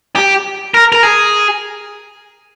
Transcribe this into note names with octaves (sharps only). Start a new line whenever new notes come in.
G4
A#4
A#4
G#4